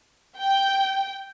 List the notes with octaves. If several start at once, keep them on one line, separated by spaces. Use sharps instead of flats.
G5